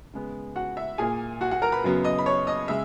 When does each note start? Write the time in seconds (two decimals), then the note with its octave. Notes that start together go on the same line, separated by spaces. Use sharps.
0.13 C#3 G#3 B3
0.56 F#4 F#5
0.77 E5
0.98 A#2 A#3 G#4 G#5
1.41 F#4 F#5
1.51 F#4 F#5
1.62 A#4 A#5
1.72 B4 B5
1.84 F#2 C#3 F#3 B3
2.04 D#5 D#6
2.18 B5
2.26 C#5 C#6
2.47 D#5 D#6
2.68 C#3 G#3 E5 E6